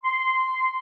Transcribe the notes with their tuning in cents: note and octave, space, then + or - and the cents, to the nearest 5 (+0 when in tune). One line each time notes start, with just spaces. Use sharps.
C6 -15